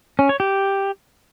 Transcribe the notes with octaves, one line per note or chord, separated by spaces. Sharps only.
C#4
C#5
G4